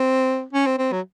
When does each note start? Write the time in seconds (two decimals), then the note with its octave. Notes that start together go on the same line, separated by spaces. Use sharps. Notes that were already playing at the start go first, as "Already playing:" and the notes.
Already playing: C4
0.53 C#4
0.66 C4
0.78 C4
0.92 F#3